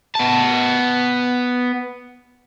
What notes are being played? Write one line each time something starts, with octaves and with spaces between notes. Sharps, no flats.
B3 A5